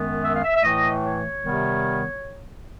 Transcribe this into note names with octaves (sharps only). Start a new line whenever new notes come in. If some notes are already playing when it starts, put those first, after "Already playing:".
Already playing: F#2 D#3 G#3 B3
E5
F5
E5
E5
A2 E3 A3 D#5
C#5
C3 D#3 G3 B3